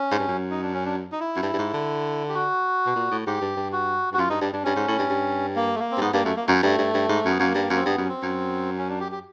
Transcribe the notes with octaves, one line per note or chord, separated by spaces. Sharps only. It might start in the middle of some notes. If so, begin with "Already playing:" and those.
Already playing: C#4
G#2
G2
F#2
D#4
D4
C#4
D4
D#4
E4
F#2
G2
G2
G#2
D3
G4
F#4
B2
A#2
A2
G#2 G4
G2
G2
F#4
G2 F#4
F#2 F4
G2 D#4
G2 D4
G2 D4
G2 C#4
G#2
A2
G2
G2
A#3
A3
A#3
C4
G2
G#2 B3
G2 A#3
F#2 A3
A#3
F#2 A3
G2 A3
G2
G2
G#2
F#2
B3
F#2 A#3
G2
F#2
C4
G2 B3
F#2
C#4
C4
F#2
C#4
D4
G4
G4